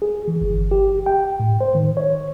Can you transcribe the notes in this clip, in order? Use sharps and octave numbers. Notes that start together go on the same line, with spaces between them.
G#4
E3
G1
G4
G5
A2
C5
D#3
C#5